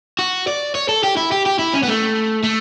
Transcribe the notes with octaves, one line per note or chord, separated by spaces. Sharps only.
F#4
D5
C#5
A4
G4
E4
G4
G4
E4
C#4
B3
A3
A3